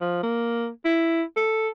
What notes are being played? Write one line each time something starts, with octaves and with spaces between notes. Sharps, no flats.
F3
A#3
E4
A4